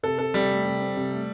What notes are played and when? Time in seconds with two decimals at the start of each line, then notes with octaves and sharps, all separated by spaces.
0.03 C3 A4
0.19 C4 A4
0.34 C3 G3
0.50 A3
0.65 C3
0.80 C4
0.96 C3
1.11 A3